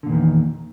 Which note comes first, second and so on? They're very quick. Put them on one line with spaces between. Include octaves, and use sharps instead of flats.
D3 A#2 E2 D#3